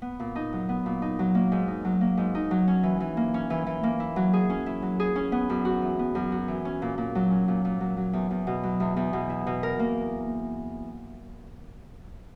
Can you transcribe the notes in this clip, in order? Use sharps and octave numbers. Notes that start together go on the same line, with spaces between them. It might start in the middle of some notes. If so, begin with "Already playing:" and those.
B3
A#2
D#4
F#3
B3
A#2
D#4
F#3
A#3
G#2
D#4
F#3
A#3
G#2
D#4
F#3
C#4
E3
E3
A#3
C#4
E3
E3
A#3
E4
F#3
G#4
C#4
E4
F#3
G#4
C#4
B3
F#2
F#4
E3
B3
F#2
F#4
E3
C#4
A#2
A#2
F#3
C#4
A#2
A#2
F#3
F#3
E2
E2
B2
F#3
E2
E2
B2
E4
B2
A#4
A#3